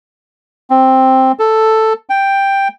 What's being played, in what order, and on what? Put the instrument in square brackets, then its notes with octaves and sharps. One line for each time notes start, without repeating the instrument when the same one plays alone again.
[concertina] C4
A4
G5